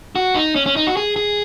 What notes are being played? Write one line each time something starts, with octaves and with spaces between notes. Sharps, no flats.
F#4
D#4
C#4
C#4
D#4
F#4
G#4
G#4